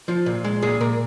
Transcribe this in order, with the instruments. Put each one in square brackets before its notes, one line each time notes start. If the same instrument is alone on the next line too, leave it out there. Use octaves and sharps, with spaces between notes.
[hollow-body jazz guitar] F3 F4
A#2
G#3
A#2 G#4
A#2 A#4